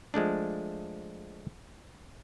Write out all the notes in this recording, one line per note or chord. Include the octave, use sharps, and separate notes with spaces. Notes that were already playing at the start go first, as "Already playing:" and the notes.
F3 G#3 A3 D4